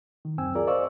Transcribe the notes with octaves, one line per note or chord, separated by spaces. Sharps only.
D#3
C#2 F#2 C4 G5 G#5 E6
F4 G#4 A#4 D5
C5 D5 D#5 F5 C#6 E6